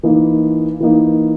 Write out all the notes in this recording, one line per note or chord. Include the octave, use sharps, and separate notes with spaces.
E3 A#3 D#4
E3 A#3 D#4